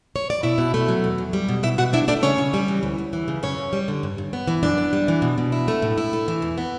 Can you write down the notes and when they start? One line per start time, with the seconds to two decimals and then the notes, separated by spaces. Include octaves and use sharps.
0.16 C#5
0.30 D5
0.43 B2 E4 E5
0.58 B2
0.74 A3
0.88 F#3
1.04 E2
1.18 E2
1.33 G3
1.49 B2
1.63 B2 E4 E5
1.78 B2 F#4 F#5
1.93 D4 E4 E5
2.08 A3 D4 D5
2.23 C#3 C#4 C#5
2.38 C#3
2.54 G3
2.68 E3
2.83 D2
2.98 D2
3.13 E3
3.28 C#3
3.43 F#2 C#4 C#5
3.58 F#2
3.73 G3
3.88 D3
4.03 G2
4.18 G2
4.33 B3
4.48 E3
4.63 F#2 D4 D5
4.78 B3
4.93 G3
5.08 E3
5.22 B2
5.38 B2
5.52 E4
5.68 A3
5.82 A2
5.98 E4
6.13 A3
6.28 E3
6.42 E2
6.58 B3